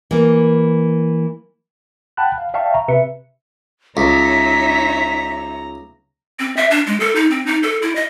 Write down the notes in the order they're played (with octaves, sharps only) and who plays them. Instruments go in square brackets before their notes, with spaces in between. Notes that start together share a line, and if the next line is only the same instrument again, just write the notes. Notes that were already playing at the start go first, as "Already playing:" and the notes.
[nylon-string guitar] E3 A#3
[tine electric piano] F#5 G5 A5 B5 F#6
F5
D5 E5 F5 G5 A5 C#6
A#5
C3 B4 E5 C#7
[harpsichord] C#2 [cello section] D#4 C#5 E5 [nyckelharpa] A#5 [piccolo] B6
[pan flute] C4
E5
D4
G#3
A4
D#4
C4
D#4
A4
E4
D#5